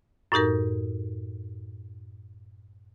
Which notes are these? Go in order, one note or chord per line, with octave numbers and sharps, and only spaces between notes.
F#2 A2 D#4 G4 A#4